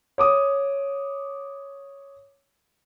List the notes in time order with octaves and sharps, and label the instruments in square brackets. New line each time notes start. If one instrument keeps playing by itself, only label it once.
[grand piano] C#5 D6 D#6